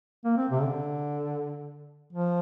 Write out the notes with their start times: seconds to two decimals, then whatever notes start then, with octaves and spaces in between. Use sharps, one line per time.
0.25 A#3
0.37 C4
0.51 C3
0.63 D3
2.13 F3